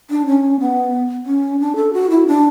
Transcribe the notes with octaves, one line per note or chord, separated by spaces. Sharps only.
D4
C#4
B3
C#4
D4
A4
F#4
E4
D4